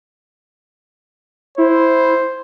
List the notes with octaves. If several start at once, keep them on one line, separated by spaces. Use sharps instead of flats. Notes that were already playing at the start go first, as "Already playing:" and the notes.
E4 C5